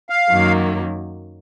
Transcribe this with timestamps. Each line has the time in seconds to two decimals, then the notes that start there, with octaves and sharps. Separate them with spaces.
0.10 F5
0.31 F#2 D#3 F#3 A#3